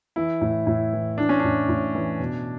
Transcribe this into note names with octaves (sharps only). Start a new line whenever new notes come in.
E3 E4
A2
A2
E3
E3 D4
C#4
A2 D4
A2
E3
B2